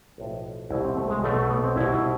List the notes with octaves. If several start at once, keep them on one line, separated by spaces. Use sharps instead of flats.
B1 A2 F3
C2 B2 E4
C4
A3
G#3
B1 B2 A3
A3
B3
C4
C2 B2 E4
E4